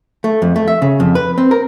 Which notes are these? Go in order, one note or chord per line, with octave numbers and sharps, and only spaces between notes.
A3
F2
A3
E5
C#3
F2
B4
C4
A#4